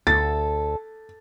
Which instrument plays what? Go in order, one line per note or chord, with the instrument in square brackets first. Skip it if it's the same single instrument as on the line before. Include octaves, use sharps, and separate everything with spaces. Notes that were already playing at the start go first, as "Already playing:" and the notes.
[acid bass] D2 [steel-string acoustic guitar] A4 [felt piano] A6